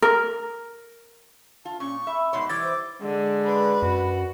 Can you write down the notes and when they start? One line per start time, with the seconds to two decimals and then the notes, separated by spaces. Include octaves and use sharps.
0.02 A#4
1.65 F4 A5
1.80 A#2 C#4 C#6
2.07 E5 B5
2.33 G#2 B2 C#5 C6
2.49 E3 G3 D6 E6 G#6 A6
2.63 C5
3.02 D3 G#3
3.45 B4
3.82 F#2 F#4